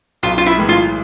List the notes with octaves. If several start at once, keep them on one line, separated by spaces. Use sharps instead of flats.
B1 F4
F4
E4
A2 E3 G#3
F4